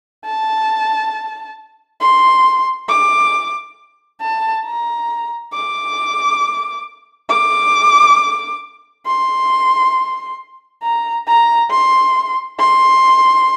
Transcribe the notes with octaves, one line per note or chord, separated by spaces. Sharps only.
A5
C6
D6
A5
A#5
D6
D6
C6
A#5
A#5
C6
C6